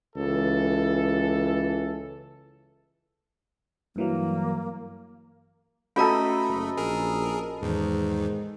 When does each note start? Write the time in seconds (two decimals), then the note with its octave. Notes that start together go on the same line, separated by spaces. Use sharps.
0.16 C#2 E3 A4
3.96 G2 E3 F#3 A#3
5.96 A3 C#4 F#4 A4 D#5 A#5 B5
6.48 F#1
6.77 A#1 G#4 A#4
7.62 E2 G#2 D#3